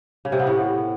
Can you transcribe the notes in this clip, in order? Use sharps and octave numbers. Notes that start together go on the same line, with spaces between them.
C#3
C3
B3
A2